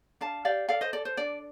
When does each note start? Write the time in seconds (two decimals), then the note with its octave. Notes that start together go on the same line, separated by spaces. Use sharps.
0.21 D4 F5 A5
0.45 G4 D5 F5
0.69 A4 D5 F5
0.81 C5 D#5
0.93 A4 D5
1.05 C5
1.17 D4 D5